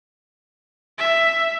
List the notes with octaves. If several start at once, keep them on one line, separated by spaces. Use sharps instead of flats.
E5